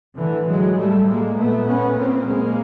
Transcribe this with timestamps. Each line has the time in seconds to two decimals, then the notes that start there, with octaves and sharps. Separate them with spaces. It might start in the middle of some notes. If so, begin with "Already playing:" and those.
0.17 A2 D3 E3
0.47 F#3 G#3
0.77 A2 G3 A3
1.07 G#3 A#3
1.37 A#2 A3 B3
1.67 B3 C#4
1.97 A#2 A#3 C4
2.27 G#3 A#3